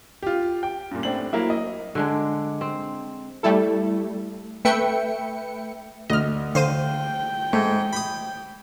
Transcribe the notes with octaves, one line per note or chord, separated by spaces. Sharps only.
F4 G4
G5
G2 A#2
A2 C4 D4 F#7
F#3 A#3 E4
D#5
D3 G#3 D4
C4
G3 A3 E4 A4
A3 B4 E5 G5 C#7
D2 D#5 F6
D3 C5 F5 G5 D#7
G#2 A3
B5 D#6